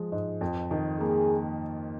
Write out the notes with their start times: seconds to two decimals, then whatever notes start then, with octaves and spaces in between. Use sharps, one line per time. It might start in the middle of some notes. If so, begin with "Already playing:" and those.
Already playing: F3 G#3
0.12 G#2
0.41 F2
0.71 D#3
1.00 A#3 G#4